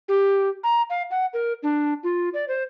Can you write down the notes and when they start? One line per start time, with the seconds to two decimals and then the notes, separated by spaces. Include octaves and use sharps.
0.08 G4
0.64 A#5
0.90 F5
1.11 F#5
1.34 A#4
1.63 D4
2.03 F4
2.34 D5
2.48 C5